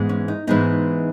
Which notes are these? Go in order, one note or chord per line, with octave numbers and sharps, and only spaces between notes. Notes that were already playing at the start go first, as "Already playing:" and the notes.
Already playing: G#2 E3 G#3 B3
C#4
D#4
G#2 E3 G#3 B3 D#4